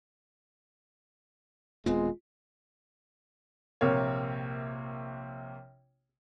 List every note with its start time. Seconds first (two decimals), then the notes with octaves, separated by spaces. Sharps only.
1.86 D#1 G#3 B3 C4 F4
3.81 A#1 C3 A#3 C#5